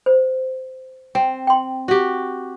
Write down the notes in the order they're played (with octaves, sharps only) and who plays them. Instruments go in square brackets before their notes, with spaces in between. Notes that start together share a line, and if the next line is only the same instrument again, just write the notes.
[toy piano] C5
[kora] C4 [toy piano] G5
[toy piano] G5 C6
[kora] F#4 G4